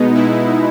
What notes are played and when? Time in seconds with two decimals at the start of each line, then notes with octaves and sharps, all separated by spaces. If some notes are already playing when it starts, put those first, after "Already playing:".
Already playing: B2 G#3 B3 D#4
0.14 E4